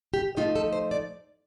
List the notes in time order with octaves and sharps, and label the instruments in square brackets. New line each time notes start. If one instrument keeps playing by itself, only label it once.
[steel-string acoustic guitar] G4
F3 A3 D#4 F4
A4
C5
D5